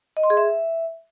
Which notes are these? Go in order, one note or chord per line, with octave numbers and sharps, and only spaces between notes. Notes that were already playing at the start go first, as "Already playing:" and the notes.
D#5
C6
G#4
E5